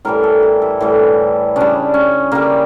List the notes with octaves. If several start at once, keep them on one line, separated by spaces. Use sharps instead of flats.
A2 E3 G3 A#4
A4
G4
E4
A2 E3 G3
C#3 G3 D4
C#4
C#3 G3 A#3